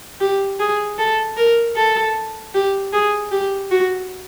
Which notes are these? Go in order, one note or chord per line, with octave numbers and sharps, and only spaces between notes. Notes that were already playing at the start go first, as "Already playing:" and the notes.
G4
G#4
A4
A#4
A4
G4
G#4
G4
F#4